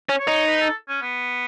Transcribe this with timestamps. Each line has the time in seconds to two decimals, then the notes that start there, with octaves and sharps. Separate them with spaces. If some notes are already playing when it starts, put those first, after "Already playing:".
0.09 C#4
0.19 C#5
0.28 D#4
0.47 B4
0.60 A4
0.88 C#4
1.02 B3